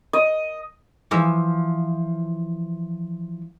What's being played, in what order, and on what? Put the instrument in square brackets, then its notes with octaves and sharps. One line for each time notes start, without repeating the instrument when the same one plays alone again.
[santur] D#5
[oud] E3 F3 E5